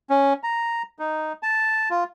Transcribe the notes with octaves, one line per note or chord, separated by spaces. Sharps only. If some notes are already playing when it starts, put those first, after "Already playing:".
C#4
A#5
D#4
A5
F4